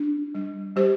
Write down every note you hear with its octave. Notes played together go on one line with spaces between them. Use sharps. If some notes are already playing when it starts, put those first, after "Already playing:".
Already playing: D4
G3
G3 G4 C5